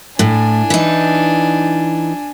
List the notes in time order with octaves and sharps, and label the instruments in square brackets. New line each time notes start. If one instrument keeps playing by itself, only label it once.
[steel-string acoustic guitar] A2 [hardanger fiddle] D4 G#5
[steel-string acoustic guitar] E3 D#4